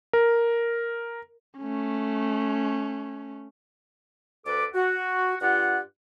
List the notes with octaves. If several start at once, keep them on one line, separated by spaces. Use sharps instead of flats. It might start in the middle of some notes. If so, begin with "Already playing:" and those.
A#4
A3 C#4
D2 A4 B4 D6
F#4
G2 F4 G4 F#5